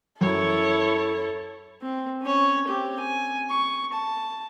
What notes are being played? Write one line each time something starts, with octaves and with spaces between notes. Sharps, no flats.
F#2 E4 A4 C#5
C4
C#4 C#5
C4 G4
G#5
C#6
A5